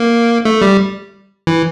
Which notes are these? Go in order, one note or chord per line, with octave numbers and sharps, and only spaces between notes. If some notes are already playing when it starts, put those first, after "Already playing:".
Already playing: A#3
A3
G3
E3